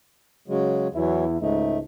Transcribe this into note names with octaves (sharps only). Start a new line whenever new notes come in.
C#3 F#3 G#3
E2 E3 F#3 E4
C#2 G#2 A3 D#4